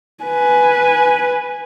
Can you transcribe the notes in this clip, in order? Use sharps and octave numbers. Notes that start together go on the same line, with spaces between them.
B4 G#5